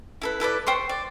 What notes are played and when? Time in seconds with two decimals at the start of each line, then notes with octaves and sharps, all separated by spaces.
0.22 E4 A4 B4
0.40 E4 A4 B4 D5
0.67 C5 G5 C6 C#6
0.89 D5